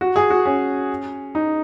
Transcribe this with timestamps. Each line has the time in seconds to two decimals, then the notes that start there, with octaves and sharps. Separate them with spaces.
0.01 F#4
0.16 G#4
0.30 F#4
0.46 C#4
1.35 D#4